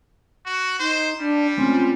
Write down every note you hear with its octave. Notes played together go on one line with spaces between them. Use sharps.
F#4
D#4 C5
G3 D4
G#3 A3 C4 C#4 F4 C6